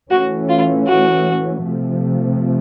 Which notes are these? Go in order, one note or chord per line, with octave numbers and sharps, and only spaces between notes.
E3 A3 C#4 F#4
F4
F#4
C3 F3 A3